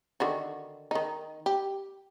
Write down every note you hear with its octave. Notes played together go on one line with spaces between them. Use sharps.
D3 D#3 F#4
D#3 D#4
G4